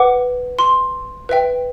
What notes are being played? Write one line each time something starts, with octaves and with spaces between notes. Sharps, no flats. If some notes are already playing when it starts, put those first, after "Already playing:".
Already playing: B4 F#5 D6
C6
B4 E5 G5